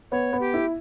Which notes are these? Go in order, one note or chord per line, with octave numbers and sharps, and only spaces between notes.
B3 C#5
B3
G4
E4